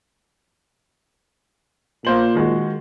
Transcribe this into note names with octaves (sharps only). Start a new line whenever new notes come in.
A#2 A#3 C5 F#7
D#3 G#3 F#4